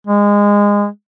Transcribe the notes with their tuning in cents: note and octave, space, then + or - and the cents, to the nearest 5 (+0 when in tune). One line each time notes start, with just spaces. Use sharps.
G#3 -20